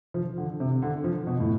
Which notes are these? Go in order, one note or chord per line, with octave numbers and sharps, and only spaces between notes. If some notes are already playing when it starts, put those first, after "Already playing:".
F3
D3
C3
D3
F3
B2
A2